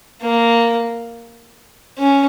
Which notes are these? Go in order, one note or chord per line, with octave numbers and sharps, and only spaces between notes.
A#3
C#4